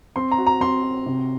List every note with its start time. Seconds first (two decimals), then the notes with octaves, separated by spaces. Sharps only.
0.16 C4 C6
0.31 A#5
0.38 F#4
0.47 A#5
0.61 C4 C6
0.83 F#4
1.06 C3